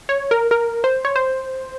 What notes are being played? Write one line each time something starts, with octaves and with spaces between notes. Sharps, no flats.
C#5
A#4
A#4
C5
C#5
C5